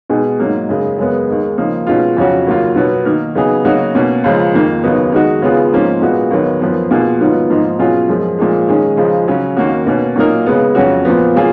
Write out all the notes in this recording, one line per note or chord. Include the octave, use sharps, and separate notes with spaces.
B2 G#3 D#4 G#4
G#2 F#3 A#3
F#2 C#3 G#3
F#2 C#3 G#3 B3
D#2 D#3 G#3
C#3 F3 A#3 D#4
B2 G#3 C#4 F4
F2 C#3 F#3 C#4 F#4
D#2 C#3 F#3 A#3 F4
B2 F#3 B3
D#3 A#3 D#4 A#4
C#3 F#3 B3 D#4 G#4
C#3 F#3 A#3 D#4 F#4
B2 A#3 C#4
C#2 C#3 F3 G#3
F2 D#3 A#3
D#2 C#3 F#3 B3 D#4
D#3 G#3 D#4 F#4
C#3 G#3 B3 F4 G#4
G#2 F3 A#3 C#4
A#2 G#3 B3 F#4
D#2 D#3 F#3 B3
F#2 F3 B3
B2 A#3 F4 G#4
G#2 D#3 F#3 B3 F4
G#2 F3 A#3 D#4
B2 F#3 C#4 F4 G#4
F#2 F3 G#3
A#2 F3 G#3
D#3 G#3 C#4 G#4
C#2 C#3 F3 G#3
C#3 F#3 C#4
D#2 D#3 A#3 C#4 F#4
B2 A#3 C#4
A#2 F#3 A#3 D#4 A#4
C#3 G#3 B3
F2 C#3 F#3 C#4 F#4
A#2 F3 B3
C#3 F#3 A#3 F4 G#4